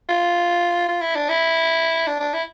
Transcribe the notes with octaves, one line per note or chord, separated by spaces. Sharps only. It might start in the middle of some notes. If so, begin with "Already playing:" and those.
F4
F4
E4
D4
E4
D4
D4
E4